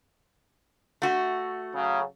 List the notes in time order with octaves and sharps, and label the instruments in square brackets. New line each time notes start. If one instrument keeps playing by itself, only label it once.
[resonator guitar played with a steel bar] A3 F#4
[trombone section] C#3 F#3